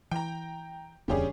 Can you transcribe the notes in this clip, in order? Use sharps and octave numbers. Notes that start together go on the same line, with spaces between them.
E3 G5 A#5
D1 E2 C#3 G3 C#4 D4 G4 G#4